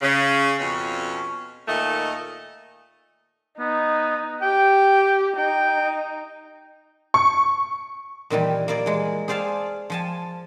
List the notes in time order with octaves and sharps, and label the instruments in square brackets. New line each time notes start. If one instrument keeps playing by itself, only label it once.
[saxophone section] C#3
F2 B2 C#4
A#2 D#3 A3 D#5
[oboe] B3 [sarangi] D#4
[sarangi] G4 [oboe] G5
[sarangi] D#4 [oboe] G5
[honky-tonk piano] C#6
[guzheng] A#2 D#3 E3 G3
A#3 E4 D5 D#5
E3 G#3
G#4 C5 D5 F5 G#5 A5
F3 G#5 A5